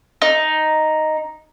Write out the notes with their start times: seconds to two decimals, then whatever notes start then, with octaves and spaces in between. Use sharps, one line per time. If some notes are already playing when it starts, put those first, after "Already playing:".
0.22 D#4